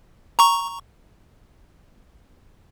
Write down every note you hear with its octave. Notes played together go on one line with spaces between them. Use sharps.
A#5 C#6